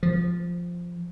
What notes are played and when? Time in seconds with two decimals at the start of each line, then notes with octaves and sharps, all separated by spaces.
0.03 F3